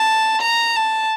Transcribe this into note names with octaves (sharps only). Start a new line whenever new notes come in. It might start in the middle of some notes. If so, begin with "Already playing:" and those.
Already playing: A5
A#5
A5